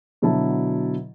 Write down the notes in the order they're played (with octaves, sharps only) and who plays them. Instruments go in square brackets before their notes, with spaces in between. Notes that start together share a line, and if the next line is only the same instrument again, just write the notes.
[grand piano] B2 D3 F#3 E4 A5